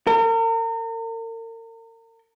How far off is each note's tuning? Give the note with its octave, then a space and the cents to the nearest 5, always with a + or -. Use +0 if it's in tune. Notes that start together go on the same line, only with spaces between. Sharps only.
A#4 -40